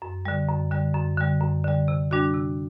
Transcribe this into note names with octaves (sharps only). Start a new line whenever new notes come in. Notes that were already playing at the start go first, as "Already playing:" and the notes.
F#2
D3 G3
F#2
D3 G3
F#2
D3 G3
F#2
D3 G3
C3
G3 D4 F#4
C3